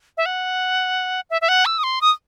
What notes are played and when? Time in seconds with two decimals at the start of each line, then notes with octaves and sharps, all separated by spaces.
0.17 E5
0.26 F#5
1.30 E5
1.41 E5
1.49 F#5
1.66 E6
1.78 D#6
1.83 C6
2.01 D#6